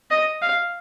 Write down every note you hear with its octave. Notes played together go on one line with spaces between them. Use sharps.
D#5
F5